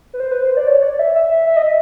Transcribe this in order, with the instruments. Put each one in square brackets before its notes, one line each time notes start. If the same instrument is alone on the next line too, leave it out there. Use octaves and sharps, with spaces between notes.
[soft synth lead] B4
C5
B4
C5
D5
C#5
D5
E5
E5
E5
E5
D#5
E5